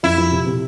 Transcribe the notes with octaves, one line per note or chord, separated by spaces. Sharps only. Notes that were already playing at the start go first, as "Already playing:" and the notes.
F2 E4
F3
C3
C3